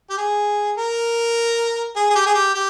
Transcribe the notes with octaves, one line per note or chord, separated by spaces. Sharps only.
G4
G#4
A#4
G#4
G#4
G4
G#4
G4
G4